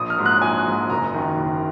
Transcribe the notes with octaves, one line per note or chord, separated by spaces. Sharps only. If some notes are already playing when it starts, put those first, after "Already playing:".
Already playing: A#1 D#6
F6
G#2 F#3
F#6
A#1 G#5
G#2 F#3
F#1 A#5
F#2 D#3
F#1